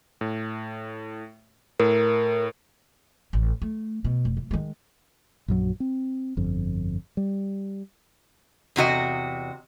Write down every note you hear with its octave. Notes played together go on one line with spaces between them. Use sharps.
A2
A2 A#4
A1
A3
B2
F1
E3
D#3 G#3
A#1 F#2 F#3
C4
G1 F2
G3
E2 C3 F#4 D#5